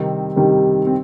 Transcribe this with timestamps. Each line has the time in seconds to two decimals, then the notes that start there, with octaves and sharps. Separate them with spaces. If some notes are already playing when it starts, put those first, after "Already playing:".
Already playing: C3 D#3 G3 C4
0.36 C3 D#3 G3
0.86 C4